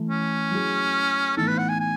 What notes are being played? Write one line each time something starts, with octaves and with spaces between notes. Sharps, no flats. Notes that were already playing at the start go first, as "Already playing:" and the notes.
Already playing: E3 A3 E4
C#4
F#3 A3 E4 G#4
A2 E3 B3 D#4 A4
B4
F#5
G#5
G#5